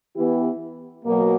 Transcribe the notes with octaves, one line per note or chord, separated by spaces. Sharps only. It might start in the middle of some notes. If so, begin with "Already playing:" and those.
E3 B3 E4 G4
B2 F#3 A#3